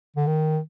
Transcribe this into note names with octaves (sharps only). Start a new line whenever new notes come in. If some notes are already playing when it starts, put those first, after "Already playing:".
D3
D#3